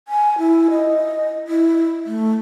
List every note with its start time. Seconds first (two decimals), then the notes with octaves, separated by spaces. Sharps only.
0.08 G#5
0.38 E4
0.70 D#5
1.47 E4
2.06 A3